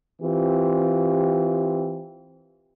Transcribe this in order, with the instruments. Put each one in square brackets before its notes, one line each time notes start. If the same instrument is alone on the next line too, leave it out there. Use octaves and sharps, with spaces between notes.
[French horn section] E3 C4 F4 G4